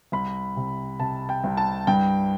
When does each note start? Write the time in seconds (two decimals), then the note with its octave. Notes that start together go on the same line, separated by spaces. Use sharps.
0.12 C2 B5
0.56 C3
0.99 C3 A5
1.29 G5
1.44 C2
1.57 A5
1.87 G2 G5